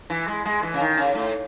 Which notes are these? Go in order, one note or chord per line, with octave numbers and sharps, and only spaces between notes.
E3
G#3
G#3
E3
C#3
D#3
C#3
A2